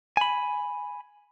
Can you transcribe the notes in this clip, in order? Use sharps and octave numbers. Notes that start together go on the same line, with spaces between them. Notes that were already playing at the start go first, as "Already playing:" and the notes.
G#5 B5